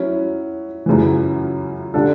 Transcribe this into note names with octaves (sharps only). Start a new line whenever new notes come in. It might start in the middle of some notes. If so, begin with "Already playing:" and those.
Already playing: F#3 C#4 E4
F#2 C#3 E3
D3 G3 D4 A4